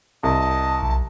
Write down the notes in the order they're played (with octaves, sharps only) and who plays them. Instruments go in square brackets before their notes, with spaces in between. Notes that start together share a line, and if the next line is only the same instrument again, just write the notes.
[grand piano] C2 [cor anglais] D#5 [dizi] A5
[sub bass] B1